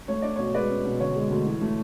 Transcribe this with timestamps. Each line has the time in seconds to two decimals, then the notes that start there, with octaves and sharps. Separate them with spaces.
0.08 A3 C#5
0.22 D4 D5
0.36 B2 C#5
0.54 G#3 B4 D5
0.69 C#4
0.85 B2
1.00 D3 C#5
1.16 G#3
1.31 D2
1.46 E3
1.61 A3